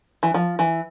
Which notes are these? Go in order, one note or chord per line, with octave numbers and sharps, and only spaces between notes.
E3
F3
E3